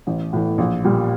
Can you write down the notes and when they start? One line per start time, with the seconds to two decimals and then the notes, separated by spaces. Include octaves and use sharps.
0.07 A1
0.33 A2 E3
0.58 A#1
0.85 A#2 G3